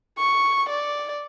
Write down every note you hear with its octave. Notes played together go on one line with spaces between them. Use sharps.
C#6
D5